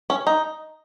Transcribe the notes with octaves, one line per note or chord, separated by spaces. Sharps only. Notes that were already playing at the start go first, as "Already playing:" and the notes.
C#4
D#4